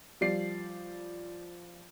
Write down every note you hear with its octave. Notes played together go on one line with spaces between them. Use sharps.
F3 G3 D5 C7